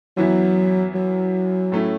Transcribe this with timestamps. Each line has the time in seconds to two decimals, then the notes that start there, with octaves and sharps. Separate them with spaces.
0.17 F#2 E3 F#3 B3 E4
0.94 F#3
1.72 A2 A3 C#4 E4